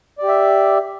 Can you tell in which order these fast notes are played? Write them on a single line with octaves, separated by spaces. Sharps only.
D5 G4 E5